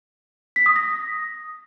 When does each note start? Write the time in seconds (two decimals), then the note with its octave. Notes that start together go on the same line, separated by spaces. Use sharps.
0.56 B6
0.66 D#6
0.76 A#6